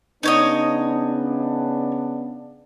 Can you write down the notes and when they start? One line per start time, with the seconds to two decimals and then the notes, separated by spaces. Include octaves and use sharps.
0.23 C#3 B3 D4 D#4 C#5 D#5